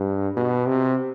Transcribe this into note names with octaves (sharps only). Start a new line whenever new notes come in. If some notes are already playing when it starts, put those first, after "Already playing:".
Already playing: G2
B2
C3